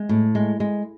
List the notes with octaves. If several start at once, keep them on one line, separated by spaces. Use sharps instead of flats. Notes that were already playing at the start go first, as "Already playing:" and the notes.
Already playing: G#3
A2
G#3
G#3